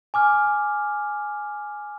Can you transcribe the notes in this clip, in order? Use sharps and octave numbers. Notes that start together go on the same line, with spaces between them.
G#5 D6 F6